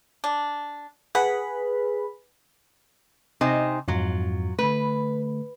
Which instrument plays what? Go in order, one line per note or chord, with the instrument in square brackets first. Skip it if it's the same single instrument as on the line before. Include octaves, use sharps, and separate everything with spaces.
[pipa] D4
[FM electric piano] G#4 B4 B5 [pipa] F#5
[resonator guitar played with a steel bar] C3 D#4 C5 [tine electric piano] G5 G#5
[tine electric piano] F2 G#2 [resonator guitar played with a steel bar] F#3 F4
[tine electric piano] D3 A3 [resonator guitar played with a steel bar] B4